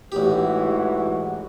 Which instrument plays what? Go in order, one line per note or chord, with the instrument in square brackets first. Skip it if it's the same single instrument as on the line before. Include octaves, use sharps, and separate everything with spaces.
[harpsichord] A1 G4 [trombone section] G#2 E3 F#4